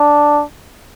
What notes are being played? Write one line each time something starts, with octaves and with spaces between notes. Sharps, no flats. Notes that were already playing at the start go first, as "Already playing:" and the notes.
Already playing: D4